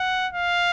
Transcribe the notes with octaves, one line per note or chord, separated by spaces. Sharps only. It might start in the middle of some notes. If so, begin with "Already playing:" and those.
Already playing: F#5
F5